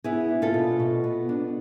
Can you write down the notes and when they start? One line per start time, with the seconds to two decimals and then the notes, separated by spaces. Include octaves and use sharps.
0.04 B3 E4 G#4
0.29 D4
0.42 F4 A4
0.54 B2
0.80 B2
1.04 B3
1.29 D4